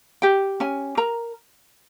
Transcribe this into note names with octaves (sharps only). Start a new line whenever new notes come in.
G4 G5
C#4 G#5
A#4 A#5